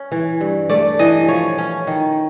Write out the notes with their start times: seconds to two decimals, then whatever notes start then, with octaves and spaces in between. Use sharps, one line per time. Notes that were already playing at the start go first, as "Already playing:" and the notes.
Already playing: C#4
0.12 E3
0.41 G2
0.69 A3 D5
0.99 E3 D#5
1.28 F3 C#5
1.58 C#4
1.87 D#3